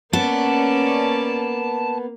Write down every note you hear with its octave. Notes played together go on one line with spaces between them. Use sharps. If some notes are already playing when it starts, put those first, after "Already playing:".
A#3 B3 C#4 D5 A5